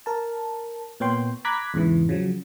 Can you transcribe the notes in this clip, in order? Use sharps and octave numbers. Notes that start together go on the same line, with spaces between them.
A#4 A5
A#2 B3 C#5 G5 C6
A#5 B5 D6 F#6 G#6 B6
E2 G#2 C#3 E3
C#3 F3 F#3